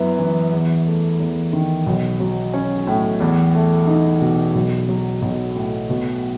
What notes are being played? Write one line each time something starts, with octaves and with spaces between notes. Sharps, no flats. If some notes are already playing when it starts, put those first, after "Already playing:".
Already playing: F#2 B3 E4
E3
E2
A3
E2
D#3
B1
F#3
C#4
A2
E2
A3
D#4
B2
B1
F#3
B1
A2
B2